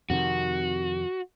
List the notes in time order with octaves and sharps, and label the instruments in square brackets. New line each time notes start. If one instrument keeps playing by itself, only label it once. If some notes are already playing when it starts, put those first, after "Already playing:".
[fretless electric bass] F2 C3 D#3 [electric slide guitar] F#4